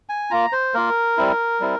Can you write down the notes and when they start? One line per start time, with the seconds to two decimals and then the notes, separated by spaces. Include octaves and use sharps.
0.09 G#5
0.31 A#3 F4 A#5
0.52 C5
0.74 A#3 F4 A#4
1.17 G3 C4 E4
1.60 G3 C4 E4